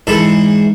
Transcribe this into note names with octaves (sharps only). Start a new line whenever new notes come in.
G#2 E3 A4